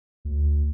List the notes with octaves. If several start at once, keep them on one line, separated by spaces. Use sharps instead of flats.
D2